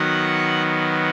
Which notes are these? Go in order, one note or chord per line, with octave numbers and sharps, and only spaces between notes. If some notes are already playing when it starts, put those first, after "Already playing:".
Already playing: D#3 F#3 B3 F#5